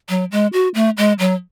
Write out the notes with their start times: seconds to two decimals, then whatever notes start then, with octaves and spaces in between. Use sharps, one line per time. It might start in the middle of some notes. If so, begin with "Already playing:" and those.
0.09 F#3
0.32 G#3
0.53 F#4
0.74 A3
0.97 G#3
1.19 F#3